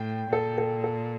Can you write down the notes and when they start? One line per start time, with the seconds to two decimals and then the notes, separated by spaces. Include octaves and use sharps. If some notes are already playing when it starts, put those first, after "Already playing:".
Already playing: A2 G5
0.33 A#2 A4
0.58 A4
0.84 A4